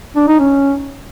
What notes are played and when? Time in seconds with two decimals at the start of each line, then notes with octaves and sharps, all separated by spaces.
0.16 D4
0.28 D#4
0.40 C#4